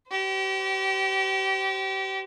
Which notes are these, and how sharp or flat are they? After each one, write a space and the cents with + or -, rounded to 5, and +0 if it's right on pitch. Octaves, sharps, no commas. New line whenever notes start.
G4 -35 C5 -25